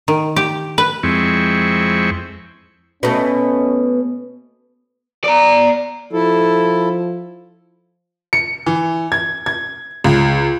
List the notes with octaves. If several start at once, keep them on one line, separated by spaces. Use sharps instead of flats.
D#3
G4
B4
F2 G#3 C4 E4 C#6
B2 A3 C#4
D5 A#5
F3 E4 A4
C#7
E3
G#6
G#6
C#2